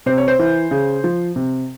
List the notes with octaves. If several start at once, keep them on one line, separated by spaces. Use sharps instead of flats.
C3 C5
C#5
C5
E3
C#3
F3
C3